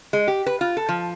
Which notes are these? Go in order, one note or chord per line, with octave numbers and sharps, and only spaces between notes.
G#3
G4
B4
F4
A4
F3